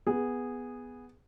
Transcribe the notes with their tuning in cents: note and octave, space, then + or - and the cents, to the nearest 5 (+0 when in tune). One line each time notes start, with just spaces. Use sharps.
B3 +0 G#4 -10